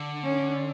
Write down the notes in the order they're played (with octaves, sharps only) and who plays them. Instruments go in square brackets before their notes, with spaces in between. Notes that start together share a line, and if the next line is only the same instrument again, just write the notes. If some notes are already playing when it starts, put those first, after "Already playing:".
Already playing: [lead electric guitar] D3
[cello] C#4